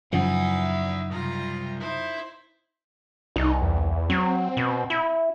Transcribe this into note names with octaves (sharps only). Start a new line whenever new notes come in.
F#2 C#3 F3 D#4 E4 E5 F#5
C2 G#2 F4 A#5
D#4 E4 C5
C2 D#4
E2
F#3 C4
B2
E4